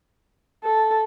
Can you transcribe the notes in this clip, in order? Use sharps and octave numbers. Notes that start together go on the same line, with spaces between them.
A4